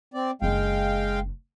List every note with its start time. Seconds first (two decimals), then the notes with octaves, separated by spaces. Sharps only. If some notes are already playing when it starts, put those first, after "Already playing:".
0.14 C4 D5
0.42 F#1 G#3 D4 F5 G5